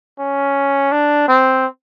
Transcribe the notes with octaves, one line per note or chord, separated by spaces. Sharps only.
C#4
D4
C4